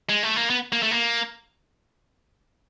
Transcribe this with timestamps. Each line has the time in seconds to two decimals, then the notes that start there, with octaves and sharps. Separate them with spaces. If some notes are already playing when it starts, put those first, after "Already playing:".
0.09 G#3
0.23 A3
0.36 A#3
0.50 B3
0.72 A#3
0.83 A3
0.91 A#3